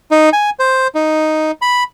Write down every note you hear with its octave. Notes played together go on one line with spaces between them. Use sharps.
D#4
G#5
C5
D#4
B5